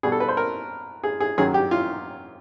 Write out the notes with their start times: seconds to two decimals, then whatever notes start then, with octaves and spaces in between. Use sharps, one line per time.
0.03 B2 G3 G#4
0.12 A4
0.20 B4
0.28 C5
0.37 A#4
1.03 G#4
1.20 G#4
1.38 F#2 D#3 F#3 G#4
1.54 G4
1.71 F4